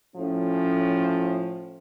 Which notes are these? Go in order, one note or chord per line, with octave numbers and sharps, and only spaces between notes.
A2 F3 C#4